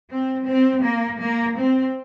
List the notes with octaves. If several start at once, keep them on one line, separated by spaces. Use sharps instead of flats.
C4
C4
A#3
A#3
C4